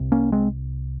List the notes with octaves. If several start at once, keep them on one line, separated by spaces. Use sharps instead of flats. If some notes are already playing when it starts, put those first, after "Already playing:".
Already playing: C2 C3
A#3 C#4
G#3 C4